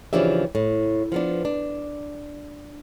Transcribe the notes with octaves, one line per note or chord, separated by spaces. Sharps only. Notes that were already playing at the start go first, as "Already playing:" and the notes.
C#3 E3 F3 D4 G4 E5
A2
F3 B3 D4
D4